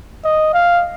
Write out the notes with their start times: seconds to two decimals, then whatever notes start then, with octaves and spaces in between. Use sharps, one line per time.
0.25 D#5
0.54 F5